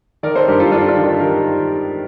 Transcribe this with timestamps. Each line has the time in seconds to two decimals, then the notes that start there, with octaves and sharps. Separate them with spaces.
0.23 D#3 A#4 D5
0.36 A4 C5
0.48 G2 G4 A#4
0.59 F4 A4
0.71 G2 D4 F4
0.88 D4 F4
0.97 D#3
1.03 D4 F4
1.20 D#3 G4 A#4